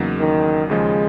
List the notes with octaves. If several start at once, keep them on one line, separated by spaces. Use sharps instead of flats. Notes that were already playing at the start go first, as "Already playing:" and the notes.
Already playing: E2 C#3 F#3 A#3 D#4
D#3
D#2 C#3 F3 G#3